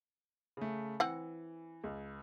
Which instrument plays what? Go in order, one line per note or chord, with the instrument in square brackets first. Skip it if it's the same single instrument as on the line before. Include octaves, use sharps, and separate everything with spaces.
[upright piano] C#3 A3
[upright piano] E3 [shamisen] C4 F#5
[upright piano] C#2